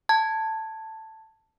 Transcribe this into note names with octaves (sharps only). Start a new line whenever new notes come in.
A5 G#6